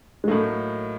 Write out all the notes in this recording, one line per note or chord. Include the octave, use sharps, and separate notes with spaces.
G#3
A2 F#3 A3 A#3 D#4